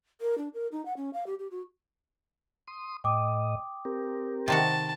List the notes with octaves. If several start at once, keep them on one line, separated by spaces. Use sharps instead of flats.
A#4
D4
A#4
D#4
F#5
C#4
F5
G4
G4
F#4
C6 D#6
A2 D#5 G5 D6 D#6
C4 G4 A#4
C3 D#3 F#4 A5